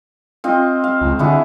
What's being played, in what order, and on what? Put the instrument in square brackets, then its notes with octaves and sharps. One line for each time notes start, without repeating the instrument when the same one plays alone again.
[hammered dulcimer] C4 F4 D#5
F5
[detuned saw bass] C#2
[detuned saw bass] D3 [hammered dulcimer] E4 F#4 G#4